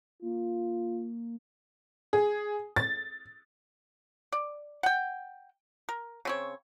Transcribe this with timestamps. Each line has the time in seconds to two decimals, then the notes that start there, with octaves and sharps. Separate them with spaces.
0.22 A#3 F4
2.13 G#4
2.76 A6
4.32 D5
4.83 F#5 G5
5.89 A#4
6.25 C#3 C4 C#5